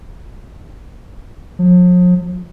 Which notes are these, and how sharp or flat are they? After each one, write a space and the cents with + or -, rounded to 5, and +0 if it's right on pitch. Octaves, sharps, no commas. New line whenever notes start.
F3 +45